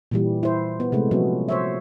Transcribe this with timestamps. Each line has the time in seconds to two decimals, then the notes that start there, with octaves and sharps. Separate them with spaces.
0.11 A#2 E3 G3
0.43 E4 C5
0.80 B3
0.92 C3 G#3 A3
1.11 F3 F#3 B3 C#4
1.49 C5 C#5 E5